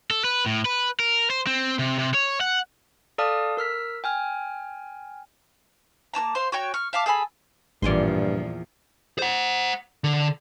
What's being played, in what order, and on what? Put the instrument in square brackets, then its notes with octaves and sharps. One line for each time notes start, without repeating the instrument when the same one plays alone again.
[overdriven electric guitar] A4
B4
A2
B4
A#4
C5
C4
C3
C3
C#5
F#5
[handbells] A4 D5 F5 A5 D#6 F6
A#4 E6 F6 B6
G5 G#5 F6
[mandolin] A#3 C#4 A5 A#5
C5 F5 C6
F#4 C#5 G5 C#6
C#6 F6
E5 F5 A5 D6
G#4 A4 G#5 B5
[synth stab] A1 D5 [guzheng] E2 G#5 C6 [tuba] G2 [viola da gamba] A#2 F3
[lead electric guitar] C5 F#5
D3